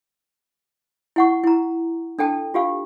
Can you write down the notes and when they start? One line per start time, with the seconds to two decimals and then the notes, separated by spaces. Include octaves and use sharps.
1.16 E4 F#5 C#6
1.44 E4 A#5
2.19 D4 A4 G5 A5
2.54 F4 G4 F5